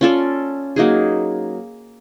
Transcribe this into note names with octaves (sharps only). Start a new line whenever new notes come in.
C#4 F4 A4 D5
F#3 A#3 D#4 G#4